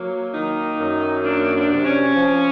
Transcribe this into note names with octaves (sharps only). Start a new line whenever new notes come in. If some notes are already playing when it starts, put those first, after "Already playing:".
Already playing: F#3 A#3
D#3 D#4
F#2
A#3 D4
D4
C3
C#4
F3